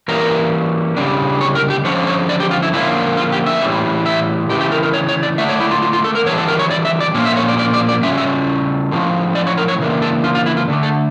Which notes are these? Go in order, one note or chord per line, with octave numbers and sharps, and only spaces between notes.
E3 G3 A#3 C#4 A#4
C#3 G3 D4
C#5
A#4
G4
D3 F3 C#4 C#5
C#5
D5
G4
F4
E4
D3 F3 A#3 C#4 E4
F4
G4
E5
A2 E3 G3 C#4
E5
C#3 E3 A3 G4
G4
A#4
A#4
C#5
C#5
D5
D3 A3 D4 E5
C#5
E4
F4
F4
F4
A4
A#4
E3 G3 D4 C#5
A4
A#4
C#5
D5
E5
D5
A#2 F3 A#3 C#4
E5
C#5
D5
D5
D5
D5
C#3 G3 C#4 E5
E5
A2 F3 C#4
D5
C#5
A#4
C#5
C#3 E3 A#3 D4
A4
F4
F4
E4
F4
D3 A3 D4
A4